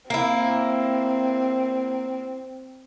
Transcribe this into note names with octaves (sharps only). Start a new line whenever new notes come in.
A#3 C4 E4